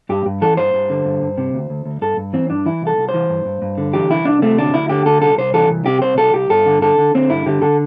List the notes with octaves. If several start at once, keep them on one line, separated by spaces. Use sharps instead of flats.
G2 G4
G2
E3 A4
G2 C5
G2
D3
G2
G2
C3
D2
D2
D2
G2 A4
G2
E3 C4
G2 D4
E3 E4
C2
A4
C2
C5
E3
G2
G2
G2
D3
E3 G4
C2 E4
C2 D4
C3 A3
D2 D4
D2 E4
D3 G4
D2 A4
C2 A4
C2 C5
E3 A4
C2
C3 G4
C2 C5
C2 A4
C2 G4
G2 A4
D3
D3 A4
D3
D3 C4
G2 E4
D3 G4
D3 A4